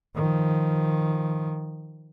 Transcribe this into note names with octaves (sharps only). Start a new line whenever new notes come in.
D#3 F3